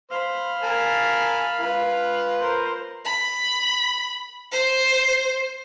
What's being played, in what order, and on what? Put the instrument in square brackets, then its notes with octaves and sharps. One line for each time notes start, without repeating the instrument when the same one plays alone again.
[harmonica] C5 [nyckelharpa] F5 B5
[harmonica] A#4 G#5 A5
F4 B4
[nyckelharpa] A#4 C5
[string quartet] B5
C5